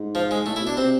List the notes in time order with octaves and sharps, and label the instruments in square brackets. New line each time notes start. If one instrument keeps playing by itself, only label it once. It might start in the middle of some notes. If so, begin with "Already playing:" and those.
Already playing: [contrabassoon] G#2
[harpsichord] F3
G#3
[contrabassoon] A2 [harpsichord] A3
[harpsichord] E4
[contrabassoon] B2 [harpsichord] D4
[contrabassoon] C3 [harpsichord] C4